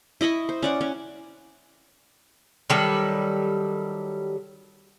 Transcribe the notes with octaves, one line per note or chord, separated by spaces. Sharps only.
E4 D#5 B5 C#6
C5
C#4 D5 F#5
C#4
D#3 F#3 G3 A4